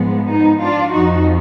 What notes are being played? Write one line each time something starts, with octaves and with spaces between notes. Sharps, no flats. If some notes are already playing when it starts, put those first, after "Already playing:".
Already playing: G#2 F3 G#3 B3
B3 D#4
D4 F4
F2 F3 D#4 F#4